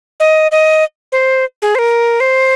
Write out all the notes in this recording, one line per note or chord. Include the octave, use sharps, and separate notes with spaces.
D#5
D#5
C5
G#4
C5
A#4
C5